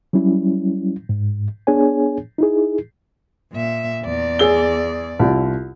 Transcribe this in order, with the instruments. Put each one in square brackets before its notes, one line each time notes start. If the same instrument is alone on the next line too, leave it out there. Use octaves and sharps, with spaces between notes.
[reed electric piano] F#3 G3 C#4 E4
G#2
B3 D4 G#4 C#5 G#5
D#4 E4 G#4
[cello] A#2 E5
E2 D5
[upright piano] G#4 E6 G7
C2 F4